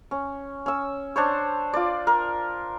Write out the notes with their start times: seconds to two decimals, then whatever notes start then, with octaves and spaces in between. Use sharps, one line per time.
0.11 C#4
0.66 C#4 E6
1.16 D4 C5 C#5
1.74 F4 D5
2.07 A#4